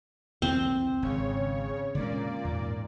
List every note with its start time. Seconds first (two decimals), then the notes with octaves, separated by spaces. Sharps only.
0.42 B1 E2 D3 C4
1.02 G#1 C#3 C#5
1.95 A#2 D3 G#3 A#3 C#4 D5
2.45 E2 G#2